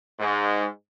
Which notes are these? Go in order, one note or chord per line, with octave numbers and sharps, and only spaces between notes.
G#2